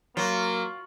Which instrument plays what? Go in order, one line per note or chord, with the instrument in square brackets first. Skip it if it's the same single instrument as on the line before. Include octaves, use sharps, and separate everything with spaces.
[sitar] F#3 [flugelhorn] A#3 [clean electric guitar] F4